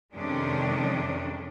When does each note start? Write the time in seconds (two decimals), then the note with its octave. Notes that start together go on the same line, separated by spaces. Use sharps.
0.14 F2 C3 D#3 G#3 C#4 D4